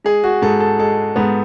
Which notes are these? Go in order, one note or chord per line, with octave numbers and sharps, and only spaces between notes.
G#3 G#4
F#4
G#2 A4
A4
G#3 A4
G#2 B3